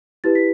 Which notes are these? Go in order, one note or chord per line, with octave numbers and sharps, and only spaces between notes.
E4 G4 B4 A6
B6